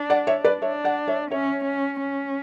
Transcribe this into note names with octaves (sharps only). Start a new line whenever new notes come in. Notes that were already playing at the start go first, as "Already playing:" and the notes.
Already playing: D4
D5 F#5
C#5 E5
B4 D5
D4 C#5 E5
D5 F#5
C#5 E5
C#4 C#5 E5
C#4
C#4